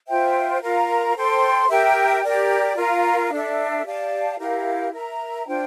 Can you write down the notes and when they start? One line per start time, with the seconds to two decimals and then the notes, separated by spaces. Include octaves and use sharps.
0.07 F4 C5 E5 G5
0.61 F4 A#4 F5 A#5
1.15 A4 C5 G5 C6
1.69 G4 A#4 E5 G5
2.23 G4 A#4 D5
2.76 F4 A#4 F5 A#5
3.30 D4 A4 E5
3.84 G4 D5 F5 A5
4.38 E4 G4 A#4 F5
4.92 A#4 E5 A#5
5.46 D4 F4 C5 G5